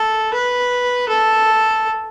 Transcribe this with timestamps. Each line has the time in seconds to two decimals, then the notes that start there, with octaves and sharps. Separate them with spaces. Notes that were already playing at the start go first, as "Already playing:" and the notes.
Already playing: A4
0.33 B4
1.08 A4